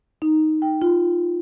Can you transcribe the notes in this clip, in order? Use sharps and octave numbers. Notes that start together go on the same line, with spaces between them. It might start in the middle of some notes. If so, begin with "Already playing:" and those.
D#4
G5
F4